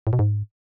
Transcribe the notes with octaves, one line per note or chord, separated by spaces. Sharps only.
A2
B2
G#2